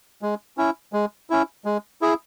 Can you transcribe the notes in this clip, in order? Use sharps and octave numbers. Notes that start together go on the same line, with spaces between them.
G#3
C#4 E4
G#3
C#4 E4
G#3
E4 G#4